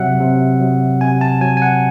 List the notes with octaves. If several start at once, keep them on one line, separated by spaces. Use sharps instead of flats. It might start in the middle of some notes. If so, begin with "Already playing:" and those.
Already playing: C3 F#3 E5 F#5
C3
F#3
C3 G#5
A5
F#3 G#5
G#5
F#5